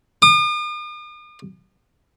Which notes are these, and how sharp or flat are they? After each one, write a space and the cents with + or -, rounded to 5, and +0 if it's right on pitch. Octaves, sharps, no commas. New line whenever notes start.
D#6 -45